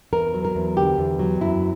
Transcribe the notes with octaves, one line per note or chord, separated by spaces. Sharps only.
E2 A#4
F#3
A#4
E2
D3 G4
E2
F#3
F#2 E4